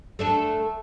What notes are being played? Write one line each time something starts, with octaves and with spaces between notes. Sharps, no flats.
A3 D4 A4